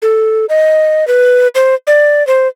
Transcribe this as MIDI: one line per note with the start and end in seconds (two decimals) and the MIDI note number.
0.02 0.46 69
0.49 1.07 75
1.07 1.48 71
1.55 1.75 72
1.87 2.26 74
2.27 2.48 72